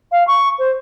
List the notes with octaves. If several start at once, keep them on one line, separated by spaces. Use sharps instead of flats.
F5
C#6
C5